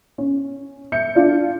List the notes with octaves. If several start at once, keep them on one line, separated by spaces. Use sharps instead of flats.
C#4
E5 G6 C#7
D4 F4 D5